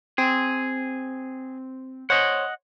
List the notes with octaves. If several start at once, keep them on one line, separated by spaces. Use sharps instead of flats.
C4 G#4
C5 C#5 D#5 F#5